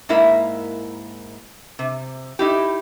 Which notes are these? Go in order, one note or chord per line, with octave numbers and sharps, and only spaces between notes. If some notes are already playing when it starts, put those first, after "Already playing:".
G#2 A#3 E4 A#4 E5
C3
D#4 E4 G4